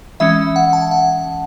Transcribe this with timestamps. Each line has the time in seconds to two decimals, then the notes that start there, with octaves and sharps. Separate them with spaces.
0.20 E3 G#3 C#4 E5
0.56 F#5
0.73 A5
0.91 F#5